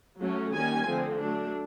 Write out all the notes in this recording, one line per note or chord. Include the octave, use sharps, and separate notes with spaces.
F#3 A3 C#4
D#3 G3 A#3 C#4 G#5
D3 F3 A3 C4
F#3 A3 D4